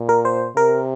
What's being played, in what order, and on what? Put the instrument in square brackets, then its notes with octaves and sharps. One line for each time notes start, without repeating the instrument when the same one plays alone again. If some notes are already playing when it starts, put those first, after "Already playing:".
Already playing: [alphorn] A#2
[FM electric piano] A#4
C5
[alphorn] C3 [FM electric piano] A#4